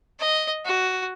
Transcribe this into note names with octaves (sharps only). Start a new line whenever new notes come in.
D#5
F#4